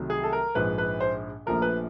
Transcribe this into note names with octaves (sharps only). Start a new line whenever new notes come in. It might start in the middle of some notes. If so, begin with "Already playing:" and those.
Already playing: C2 C3 D#3 F#3 A3
G#4
A4
A#4
A#1 G#2 F3 B4
B4
C5
A#1 A#2 F3 A3 A#4
B4